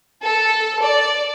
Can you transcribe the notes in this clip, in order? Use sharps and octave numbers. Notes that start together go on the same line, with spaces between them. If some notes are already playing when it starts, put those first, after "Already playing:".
A4
D5